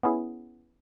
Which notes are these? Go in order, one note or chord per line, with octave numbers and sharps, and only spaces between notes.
B3 C#4 E4 G#4